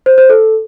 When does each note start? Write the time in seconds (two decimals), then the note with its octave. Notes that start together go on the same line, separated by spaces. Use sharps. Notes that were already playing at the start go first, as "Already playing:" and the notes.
0.06 C5
0.18 C5
0.29 A4